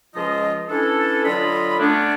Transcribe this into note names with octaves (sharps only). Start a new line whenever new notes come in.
C#2 F3 F4 D#5
E3 C#4 D4 A4
D3 F#3 F4 D#5 B5
D3 A3 B3 C#4 D4